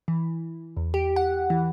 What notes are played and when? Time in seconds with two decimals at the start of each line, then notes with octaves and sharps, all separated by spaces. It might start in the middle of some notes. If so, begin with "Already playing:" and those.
0.08 E3
0.77 E2
0.94 G4
1.16 F#5
1.50 E3